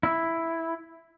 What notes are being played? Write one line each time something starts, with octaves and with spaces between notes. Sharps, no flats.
E4